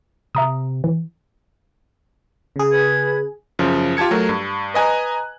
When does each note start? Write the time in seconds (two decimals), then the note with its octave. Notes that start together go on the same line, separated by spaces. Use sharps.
0.35 C3 E5 A#5 D#6
0.84 E3
2.56 C#3 G#4
2.71 B4 B5 G#6
3.59 F#2 C#3 F3
3.97 F4 G4 A5 G#6 C#7
4.11 F#3 A3 A#4
4.29 G2
4.74 B4 D#5 G#5 A#5 F#6